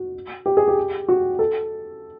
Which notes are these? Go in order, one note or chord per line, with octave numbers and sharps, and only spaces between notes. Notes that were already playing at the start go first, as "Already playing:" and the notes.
Already playing: F#4
G4
G#4
G4
F#4
A4